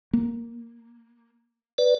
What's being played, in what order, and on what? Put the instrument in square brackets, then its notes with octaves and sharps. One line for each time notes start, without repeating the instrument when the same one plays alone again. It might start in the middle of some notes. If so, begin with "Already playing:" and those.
[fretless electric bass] A#3
[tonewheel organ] B4 D5